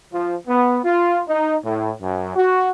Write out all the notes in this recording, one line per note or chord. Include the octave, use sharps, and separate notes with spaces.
F3
B3
F4
D#4
A2
F#2
F#4